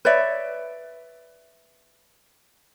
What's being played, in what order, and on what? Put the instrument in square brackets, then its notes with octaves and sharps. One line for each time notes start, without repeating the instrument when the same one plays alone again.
[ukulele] B4 C#5 D5 E5